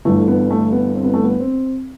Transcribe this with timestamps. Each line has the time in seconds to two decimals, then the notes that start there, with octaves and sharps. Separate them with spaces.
0.05 G1 G2 E3 A3
0.27 B3
0.50 A3
0.72 B3
0.95 C4
1.04 B3
1.14 A3
1.24 B3
1.39 C4